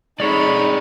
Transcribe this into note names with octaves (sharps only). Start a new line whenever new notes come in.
G#3 D#4 G#4 A4 C#5 D5 B5